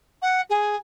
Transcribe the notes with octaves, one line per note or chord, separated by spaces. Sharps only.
F#5
G#4